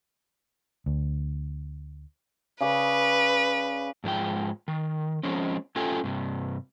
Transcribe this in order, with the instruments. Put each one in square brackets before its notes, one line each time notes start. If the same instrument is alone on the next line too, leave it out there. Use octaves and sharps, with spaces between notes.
[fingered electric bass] D2
[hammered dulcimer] C#3 D5 D6 [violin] B4
[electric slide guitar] G#2 F3 G#3 G5
D#3
F3 G#3 C4 C#4
A3 C#4 F4 G4 A4 G#5
G2 C3